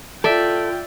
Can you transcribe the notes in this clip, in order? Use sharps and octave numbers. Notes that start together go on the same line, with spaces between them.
F4 A4 D5 E5 G5